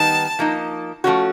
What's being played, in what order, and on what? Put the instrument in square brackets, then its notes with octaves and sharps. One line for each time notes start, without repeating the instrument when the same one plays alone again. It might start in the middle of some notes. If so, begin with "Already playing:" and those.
Already playing: [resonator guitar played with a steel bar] D#3 G3 B3 D#4 [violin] A5
[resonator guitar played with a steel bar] F3 A#3 D#4
F3 A3 C#4 F#4